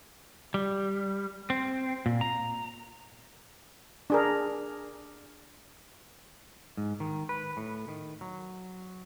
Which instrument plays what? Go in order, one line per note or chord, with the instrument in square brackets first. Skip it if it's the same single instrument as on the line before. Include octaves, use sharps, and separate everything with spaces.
[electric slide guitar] G3
C4
A#2
A#5
[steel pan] D4 G#4 A#4
[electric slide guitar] G#2
D#3
B4
A2
D#3
F#3